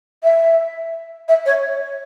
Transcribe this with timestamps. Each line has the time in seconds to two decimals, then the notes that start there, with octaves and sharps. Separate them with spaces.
0.23 E5
1.28 E5
1.46 C#5